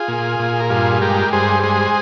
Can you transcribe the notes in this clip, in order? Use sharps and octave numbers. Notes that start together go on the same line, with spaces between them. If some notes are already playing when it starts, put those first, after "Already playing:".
Already playing: F4 G#4
A#2
A#2
A#4
G2 F4 G#4
G#3 G4 A#4
G2 G#4 C5
G#3 G#4 C5